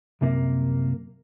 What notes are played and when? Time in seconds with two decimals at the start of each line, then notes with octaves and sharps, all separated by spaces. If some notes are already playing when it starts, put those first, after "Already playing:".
0.21 C2 F#2 C3 A#3